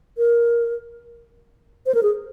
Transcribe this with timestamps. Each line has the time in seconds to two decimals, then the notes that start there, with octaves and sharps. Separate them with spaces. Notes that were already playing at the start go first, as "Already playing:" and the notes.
0.18 A#4
1.86 C5
1.95 A#4
2.03 G#4